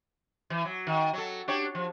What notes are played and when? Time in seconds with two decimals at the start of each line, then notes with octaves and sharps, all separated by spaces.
0.50 E3
0.65 F#3
0.87 D#3
1.13 F#3 A4
1.48 D4 G4 C#5
1.75 F3